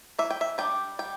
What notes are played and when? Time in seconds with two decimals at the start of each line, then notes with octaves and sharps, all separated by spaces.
0.19 E3 E5
0.31 G5
0.41 E5
0.58 G3 D4 G5
0.99 G3 G5